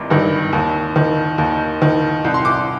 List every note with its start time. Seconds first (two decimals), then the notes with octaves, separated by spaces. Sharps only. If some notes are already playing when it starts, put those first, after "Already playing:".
Already playing: G#1 G2 D#3 D6
0.10 G2 D#3
0.53 D#2
0.96 D#3
1.38 D#2
1.82 D#3
2.24 C2
2.34 C6
2.45 D6